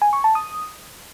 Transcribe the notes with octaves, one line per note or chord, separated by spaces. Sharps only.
G#5
C#6
A5
D#6